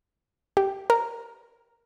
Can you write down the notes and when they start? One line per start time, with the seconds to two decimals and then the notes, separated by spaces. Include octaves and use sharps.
0.57 G4
0.90 A#4